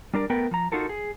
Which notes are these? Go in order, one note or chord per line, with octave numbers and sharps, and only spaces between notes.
G3 D4 A#4 D5
A3 B3 A#4 B4 G5
F3 A#5
D#4 F4 F#4 A4 A#4
G#4